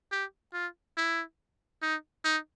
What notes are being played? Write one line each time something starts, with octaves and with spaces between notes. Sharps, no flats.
G4
F4
E4
D#4
D#4